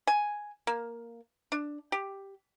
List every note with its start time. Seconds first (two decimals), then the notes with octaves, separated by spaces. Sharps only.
0.07 G#5
0.67 A#3
1.52 D4
1.92 G4